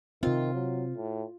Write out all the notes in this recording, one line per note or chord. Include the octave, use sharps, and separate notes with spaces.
C3 D#3 C4 F4
F#3
A2